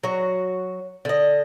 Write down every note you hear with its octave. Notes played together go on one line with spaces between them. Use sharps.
F#3 F#4
D3 D#5